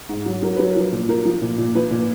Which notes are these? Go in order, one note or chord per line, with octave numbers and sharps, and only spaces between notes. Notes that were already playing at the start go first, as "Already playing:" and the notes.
G#2
F#3
F#3 A#4
F#3 B4
A#4
F3
A#2
F3 A#4
F3
A#2
A#2
F3 B4
A#2